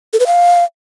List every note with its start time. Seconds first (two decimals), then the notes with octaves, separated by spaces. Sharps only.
0.13 A4
0.20 B4
0.27 F5